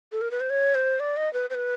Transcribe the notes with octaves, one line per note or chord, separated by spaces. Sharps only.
A4
A#4
B4
C5
C#5
C5
D5
D#5
B4
C5
B4